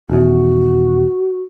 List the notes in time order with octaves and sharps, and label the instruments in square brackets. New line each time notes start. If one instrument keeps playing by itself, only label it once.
[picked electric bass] D#1 E2 [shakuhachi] F#4